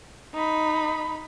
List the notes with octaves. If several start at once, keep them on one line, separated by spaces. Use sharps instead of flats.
D#4 B5